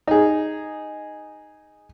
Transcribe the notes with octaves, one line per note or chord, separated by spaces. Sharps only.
D#4 G#4